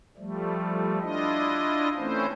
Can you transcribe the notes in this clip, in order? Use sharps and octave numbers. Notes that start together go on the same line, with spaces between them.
F3 G3 A3
D4 E4 F4 D#5
E3 A3 C4 C#4 E4 C5